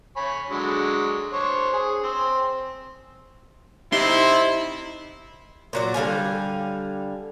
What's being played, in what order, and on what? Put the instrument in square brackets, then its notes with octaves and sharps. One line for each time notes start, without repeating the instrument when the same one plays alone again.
[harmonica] C#5 G#5 B5
D3 F#3 G#3
D4 C5 C#5
G#4
C4
[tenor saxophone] C3 [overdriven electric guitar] D#4 [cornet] E4 [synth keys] C6
[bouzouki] A#2 F#3 D5
D3 G3 F5 G#5